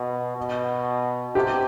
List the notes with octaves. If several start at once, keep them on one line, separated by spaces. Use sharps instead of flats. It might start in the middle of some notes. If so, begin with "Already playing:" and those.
Already playing: B2
B2
C3 G4